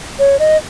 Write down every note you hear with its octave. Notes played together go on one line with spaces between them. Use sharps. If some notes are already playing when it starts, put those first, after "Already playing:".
C#5
D#5